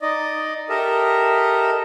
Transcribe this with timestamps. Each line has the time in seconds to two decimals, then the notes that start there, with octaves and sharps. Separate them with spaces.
0.01 D#4 D5 D#5
0.69 G4 A4 A#4 D#5 E5